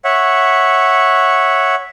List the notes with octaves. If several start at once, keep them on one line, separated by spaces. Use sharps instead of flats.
C#5 E5 F#5